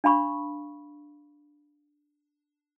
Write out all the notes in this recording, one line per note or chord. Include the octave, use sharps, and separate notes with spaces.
D4 F5 B5 C#6